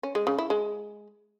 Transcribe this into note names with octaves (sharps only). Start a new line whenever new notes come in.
C#4
G#3
C#3
E4
G#3